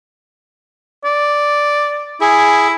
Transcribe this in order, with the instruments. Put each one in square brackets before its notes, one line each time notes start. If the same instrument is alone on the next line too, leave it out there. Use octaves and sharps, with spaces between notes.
[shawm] D5
[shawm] E4 [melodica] G#4